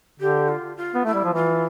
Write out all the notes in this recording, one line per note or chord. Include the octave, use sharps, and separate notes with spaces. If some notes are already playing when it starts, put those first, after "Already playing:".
D3 G4
F4
F4
B3
A3 E4
G3
F3
E3 F4